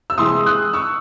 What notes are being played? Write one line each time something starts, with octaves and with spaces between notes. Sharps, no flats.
E6
C3 E3 G#3 C6 D#6
D#6 F#6
C#6 E6